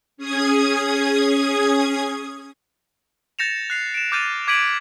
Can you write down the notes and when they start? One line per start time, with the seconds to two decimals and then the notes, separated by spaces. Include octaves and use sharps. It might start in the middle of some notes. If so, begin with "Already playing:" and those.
0.17 C#4 G#4 D#6 G#6
3.39 G6 A6 A#6 C#7 E7 F7
3.70 F#6 C7 F7
3.94 D7 E7
4.12 D6 F6 G6 A6 D#7 F7
4.48 D6 G#6 B6 D7 D#7 F#7